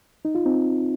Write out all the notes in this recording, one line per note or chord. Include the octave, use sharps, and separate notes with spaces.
D#4
F4
C4 D#4